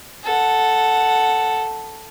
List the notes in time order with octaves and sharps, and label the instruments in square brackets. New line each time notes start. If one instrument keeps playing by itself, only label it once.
[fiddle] A4 F#5